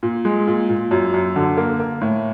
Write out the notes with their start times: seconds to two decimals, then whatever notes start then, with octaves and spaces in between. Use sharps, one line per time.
0.03 A#2
0.25 G#3
0.47 A#2
0.69 A#2
0.91 F#2
1.14 F#2
1.36 D3
1.57 A#3
1.80 A#3
2.01 A2